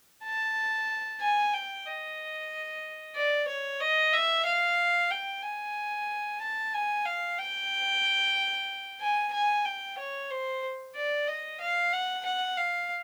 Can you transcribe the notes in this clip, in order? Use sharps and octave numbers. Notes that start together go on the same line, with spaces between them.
A5
G#5
G5
D#5
D5
C#5
D#5
E5
F5
G5
G#5
A5
G#5
F5
G5
G#5
G#5
G5
C#5
C5
D5
D#5
F5
F#5
F#5
F5